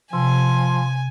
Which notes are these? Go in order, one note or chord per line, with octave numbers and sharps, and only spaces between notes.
C3 F3 G#5 C6